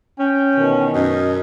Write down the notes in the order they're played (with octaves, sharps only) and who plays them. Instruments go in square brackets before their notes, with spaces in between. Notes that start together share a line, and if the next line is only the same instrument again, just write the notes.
[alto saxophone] C#4 [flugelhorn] G5
[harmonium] B2 D#3 [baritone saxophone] E3
[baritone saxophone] F#2 [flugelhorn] D#5